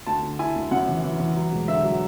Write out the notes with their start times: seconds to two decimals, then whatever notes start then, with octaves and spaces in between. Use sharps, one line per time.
0.07 D2 A5
0.23 D3
0.39 E4 G#5
0.55 D2
0.71 F#2 F#5
0.88 E3
1.04 E3
1.20 E3
1.36 F#3
1.52 E1
1.68 D3 E5
1.84 F#3